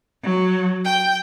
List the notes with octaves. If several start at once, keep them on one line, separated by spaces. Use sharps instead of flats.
F#3
G5